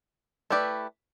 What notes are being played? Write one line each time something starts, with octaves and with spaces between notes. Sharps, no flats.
A3 E4 G4 B4 D5